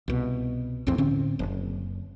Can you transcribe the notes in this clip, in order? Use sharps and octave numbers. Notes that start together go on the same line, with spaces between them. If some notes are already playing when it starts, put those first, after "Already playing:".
C2 B2
A#1 E2 A2 C4
A2 D3 C4 C#4
F#1